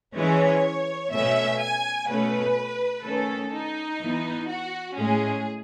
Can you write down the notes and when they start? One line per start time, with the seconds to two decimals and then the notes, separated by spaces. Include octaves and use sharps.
0.16 E3 G#3 C#4 C#5
1.12 B2 A3 C#4 E5
1.60 G#5
2.08 B2 A3 C#4 B4
3.04 D#3 A3 C#4 A4
3.53 D#4
4.00 E3 B3
4.49 F#4
4.96 A2 G#3 C#4 G#4